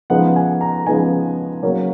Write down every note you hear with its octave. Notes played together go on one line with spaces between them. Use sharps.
C#3 F3 G#3 B3 D#4 F#5
G#5
A#5
C#3 F3 G#3 B3 D#4 G#5
C#3 F#3 A#3 C#4